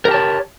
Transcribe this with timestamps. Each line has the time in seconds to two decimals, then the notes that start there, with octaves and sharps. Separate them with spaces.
0.05 A#4
0.08 G4
0.11 A5
0.14 C#5